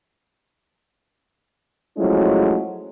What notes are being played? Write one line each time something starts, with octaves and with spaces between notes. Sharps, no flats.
F3 F#3 G#3 A3 C#4 E4